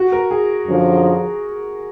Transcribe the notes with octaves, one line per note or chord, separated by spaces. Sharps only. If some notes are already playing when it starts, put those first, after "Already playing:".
Already playing: F#4
A#4
G#4
F#2 D3 F3